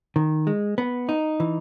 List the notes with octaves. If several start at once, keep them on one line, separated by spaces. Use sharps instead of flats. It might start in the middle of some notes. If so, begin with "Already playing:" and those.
D#3
G#3
B3
D#4
E3